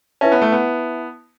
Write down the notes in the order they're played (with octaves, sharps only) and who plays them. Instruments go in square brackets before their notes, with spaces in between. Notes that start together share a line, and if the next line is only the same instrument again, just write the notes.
[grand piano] C#4 [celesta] E4 B4 E5 A5
[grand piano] B3
A3
B3